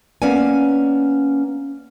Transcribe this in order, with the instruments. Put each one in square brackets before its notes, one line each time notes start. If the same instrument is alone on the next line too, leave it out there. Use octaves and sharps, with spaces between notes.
[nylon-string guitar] A#3 B3 C#4 D5 G#5